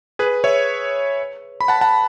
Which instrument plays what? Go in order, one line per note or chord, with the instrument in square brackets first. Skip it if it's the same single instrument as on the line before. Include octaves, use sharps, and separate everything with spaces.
[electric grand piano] G#4 B4
C#5 E5
B5
F#5 A5
F#5 A5